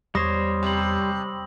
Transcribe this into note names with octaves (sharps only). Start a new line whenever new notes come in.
E2 G3 C5 C#5 C#6 D#6 A#6
C3 B5 F#7